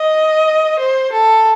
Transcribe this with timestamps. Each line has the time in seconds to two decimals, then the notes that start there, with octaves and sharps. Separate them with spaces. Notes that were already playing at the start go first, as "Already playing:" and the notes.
Already playing: D#5
0.79 C5
1.12 A4